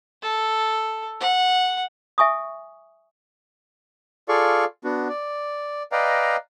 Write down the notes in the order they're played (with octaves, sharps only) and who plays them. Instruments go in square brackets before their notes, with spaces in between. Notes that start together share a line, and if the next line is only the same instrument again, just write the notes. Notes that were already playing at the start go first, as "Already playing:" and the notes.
[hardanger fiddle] A4
F#5
[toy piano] E5 G#5 C#6 D#6
[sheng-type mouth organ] F4 G#4 A4 D5 F5 C#6
B3 D4 F#4
D5
B4 D5 D#5 F5 G5 A#5